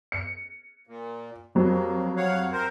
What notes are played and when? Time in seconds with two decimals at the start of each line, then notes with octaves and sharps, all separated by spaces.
0.12 C#7
0.87 A#2
1.55 F2 F#3 G3 A#3
2.17 C#5 F5 F#5
2.52 C4 A#4 C5